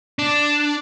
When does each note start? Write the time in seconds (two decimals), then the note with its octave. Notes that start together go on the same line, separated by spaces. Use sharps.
0.19 D4